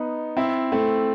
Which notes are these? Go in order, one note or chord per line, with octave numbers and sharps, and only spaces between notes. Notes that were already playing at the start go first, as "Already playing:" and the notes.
Already playing: B3 D#4
C4 E4
A3 C4